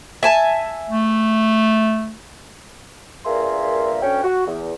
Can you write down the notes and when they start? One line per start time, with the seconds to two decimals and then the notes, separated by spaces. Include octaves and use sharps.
0.23 E5 G#5 A5
0.90 A3
3.25 G2 A#2 A#3 G#4 E5 C6
4.02 D2 C#4 G5
4.23 F#4
4.47 E2